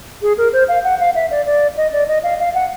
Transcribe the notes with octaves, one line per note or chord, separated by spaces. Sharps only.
G#4
A#4
C5
F5
F#5
F5
E5
D5
D5
D#5
D5
D#5
F5
F5
F#5